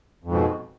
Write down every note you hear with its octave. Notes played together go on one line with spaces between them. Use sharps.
F2 G#2 B2